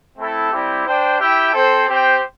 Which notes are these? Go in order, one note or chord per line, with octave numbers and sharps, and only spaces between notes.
A3 C4 E4 A4
G3 C4 E4 G4
D4 C5 G5
E4 G4 E5 G5
C4 A4 C5
C4 G4 C5 G5